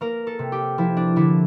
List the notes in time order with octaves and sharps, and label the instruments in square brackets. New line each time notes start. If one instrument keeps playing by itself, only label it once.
[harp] A#3 A#4
A4
C3
G4
F3 E4
D4
D3 E4